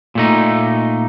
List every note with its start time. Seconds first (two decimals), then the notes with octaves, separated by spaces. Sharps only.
0.15 A#2 A3 D#4